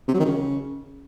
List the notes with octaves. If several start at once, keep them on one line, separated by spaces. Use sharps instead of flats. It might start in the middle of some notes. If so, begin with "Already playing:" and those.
C3
F#3
D#3
C#3